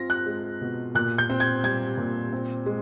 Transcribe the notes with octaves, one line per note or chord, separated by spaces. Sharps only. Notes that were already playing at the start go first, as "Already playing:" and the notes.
Already playing: C4 F4 A#6
F#6
G#3
B2
A#2 F#6
G6
C4
G#6
G3 G#6
A#2
C4
G#3